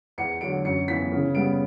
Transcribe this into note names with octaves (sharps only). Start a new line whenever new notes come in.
E2 C#7
D3 F#3 D7
F#2 C#7
E3 B3 B6
C#3
G3 B3 D7